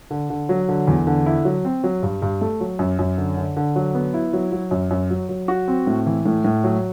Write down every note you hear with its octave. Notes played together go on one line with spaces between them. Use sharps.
D3
D3
F#3
D3
E2
D3
E4
F#3
C4
F#3
G2
G2
A3
F#3
F#2
F#2
D3
D3
D3
F#3
B3
E4
F#3
F#3
F#2
F#2
F#3
F#3
F#4
C4
A2
E3
A2
A2
F#3